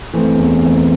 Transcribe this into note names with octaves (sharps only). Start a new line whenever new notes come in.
E3 A3 C4
E2
E3 A3 C4